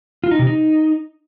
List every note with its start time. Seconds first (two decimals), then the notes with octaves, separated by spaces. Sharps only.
0.24 F4
0.31 D#4
0.39 C3
0.47 D#4